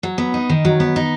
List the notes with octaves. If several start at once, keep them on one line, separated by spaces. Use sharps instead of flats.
F#3
B3
D#4
D#3
F#3
B3
D#4